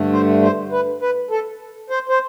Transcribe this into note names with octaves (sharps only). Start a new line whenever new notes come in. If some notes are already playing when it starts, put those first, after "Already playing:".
Already playing: G2 D3 A3
C5
C5
B4
B4
A4
C5
C5